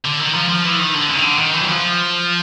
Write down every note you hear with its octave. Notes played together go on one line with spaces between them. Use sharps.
D3
D#3
F3
F3
E3
D#3
D3
C#3
D#3
D3
D#3
E3
F#3
F3